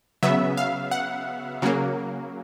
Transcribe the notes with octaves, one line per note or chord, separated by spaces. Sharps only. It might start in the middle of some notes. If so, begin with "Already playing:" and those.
C#3 F#3 B3 E5
F5
F#5
C#3 F#3 A#3